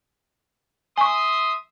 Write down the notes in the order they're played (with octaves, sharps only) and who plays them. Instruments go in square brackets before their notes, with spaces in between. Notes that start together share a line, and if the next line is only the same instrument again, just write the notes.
[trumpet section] E5 C6 D#6 [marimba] G#5 C#6